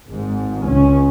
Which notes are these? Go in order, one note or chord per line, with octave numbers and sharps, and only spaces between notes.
G#1 G#2
C#2 C#3 C#4